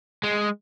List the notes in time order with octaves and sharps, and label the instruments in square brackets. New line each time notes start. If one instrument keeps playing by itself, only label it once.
[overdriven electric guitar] G#3